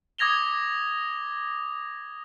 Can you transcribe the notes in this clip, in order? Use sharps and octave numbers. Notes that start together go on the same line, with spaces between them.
D6 D#6 G#6 A#6 F7 G7